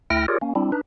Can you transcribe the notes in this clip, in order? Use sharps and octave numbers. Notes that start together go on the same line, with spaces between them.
D2 A3 E4 G5 F6 A#6
F4 G4 G#4 A#4 C#5 D5
A#3 C#4
G3 C4 D4 E4
D4 D#4 B4